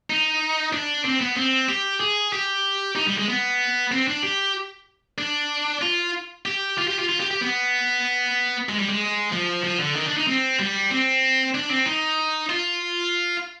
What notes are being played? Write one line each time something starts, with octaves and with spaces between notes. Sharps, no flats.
D#4
D4
C4
B3
C4
G4
G#4
G4
D#4
G3
G#3
B3
C4
D4
G4
D4
F4
G4
F4
G4
F4
F4
G4
G4
B3
G#3
G3
G#3
F3
F3
D3
D#3
D4
D#4
C4
G3
C4
D4
C4
D#4
F4